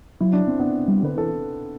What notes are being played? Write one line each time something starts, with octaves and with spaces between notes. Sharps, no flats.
F#3 E4
D4
C4
B3 D4
G3
D3 B4
E3 A4